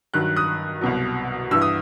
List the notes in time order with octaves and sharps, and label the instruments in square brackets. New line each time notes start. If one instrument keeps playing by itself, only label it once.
[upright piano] G2 D#3 F#3 F#6
D#6 F#6
C2 B2 F#3
G2 E3 E6
D#6